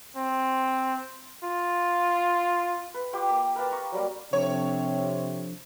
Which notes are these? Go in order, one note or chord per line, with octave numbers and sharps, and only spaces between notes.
C4
F4
B4
F4 G4 G5 D6
A#3
A#4 B4 F5 A5
A#5 C#6
F#3 G3 A#3
C3 F3 D4 A4 C#5